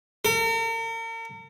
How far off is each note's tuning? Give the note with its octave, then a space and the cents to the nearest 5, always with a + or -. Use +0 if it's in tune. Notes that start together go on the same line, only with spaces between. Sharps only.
A#4 -40